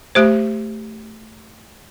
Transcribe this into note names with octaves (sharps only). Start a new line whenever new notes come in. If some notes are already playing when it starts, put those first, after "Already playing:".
A3 G4 C5